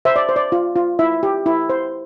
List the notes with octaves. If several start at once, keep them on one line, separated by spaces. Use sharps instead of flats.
C5 E5
D5
C5
D5
F4
F4
E4 E5
G4
E4
C5